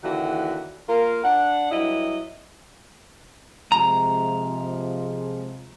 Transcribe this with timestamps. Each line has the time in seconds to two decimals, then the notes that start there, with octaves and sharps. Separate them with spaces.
0.04 D#2 D3 E3 F#4
0.89 A#3 F4 A#4
1.24 D4 F#5
1.71 G2 F#3 E4 D#5
3.72 C3 F3 G#3 A#5